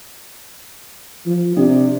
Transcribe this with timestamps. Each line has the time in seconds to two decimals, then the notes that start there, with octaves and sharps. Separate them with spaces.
1.26 F3
1.57 C3 D4